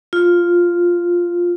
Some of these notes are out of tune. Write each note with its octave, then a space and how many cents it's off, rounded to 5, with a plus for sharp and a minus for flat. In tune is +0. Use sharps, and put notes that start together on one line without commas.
F4 +0